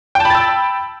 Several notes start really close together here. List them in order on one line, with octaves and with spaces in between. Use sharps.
G5 A5 B5 A6 E6